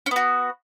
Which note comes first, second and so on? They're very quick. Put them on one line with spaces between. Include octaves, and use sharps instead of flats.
C#4 B3 F#4